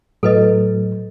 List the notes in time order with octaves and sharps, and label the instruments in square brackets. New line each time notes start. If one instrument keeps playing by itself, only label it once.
[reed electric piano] A2 F#3 [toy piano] A4 B4 D#5